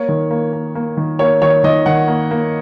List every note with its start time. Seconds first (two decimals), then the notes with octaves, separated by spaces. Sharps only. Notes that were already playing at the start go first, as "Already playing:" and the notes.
Already playing: A#3 C#5
0.09 D#3
0.31 A#3
0.53 A#3
0.75 A#3
0.97 D#3
1.19 A#3 C#5
1.42 D#3 C#5
1.64 D#3 D#5
1.86 D#3 F#5
2.08 A#3
2.31 A#3